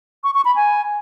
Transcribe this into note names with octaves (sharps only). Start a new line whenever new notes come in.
C#6
C#6
B5
G#5